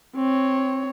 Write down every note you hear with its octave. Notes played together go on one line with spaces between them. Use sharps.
C4 C#5